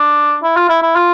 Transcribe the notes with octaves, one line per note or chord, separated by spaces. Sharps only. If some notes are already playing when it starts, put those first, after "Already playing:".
Already playing: D4
E4
F4
E4
E4
F4